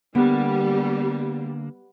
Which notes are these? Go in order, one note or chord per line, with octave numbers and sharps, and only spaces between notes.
D3 G3 A#3 B3